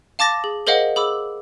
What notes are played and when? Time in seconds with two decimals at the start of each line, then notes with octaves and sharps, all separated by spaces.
0.19 F5 A5 D6 A6 A#6
0.44 G#4
0.67 G#4 A#4 C5 D#5 F5 F#5
0.96 G#4 B5 D6 E6